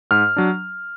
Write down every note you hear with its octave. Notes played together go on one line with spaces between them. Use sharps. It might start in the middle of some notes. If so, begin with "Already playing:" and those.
G#2 F6
F#3 D4